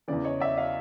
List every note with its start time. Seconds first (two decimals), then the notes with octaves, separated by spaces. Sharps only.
0.08 E2 C#3 E3 D5
0.24 C#5 D#5
0.40 D5 E5
0.57 D#5 F5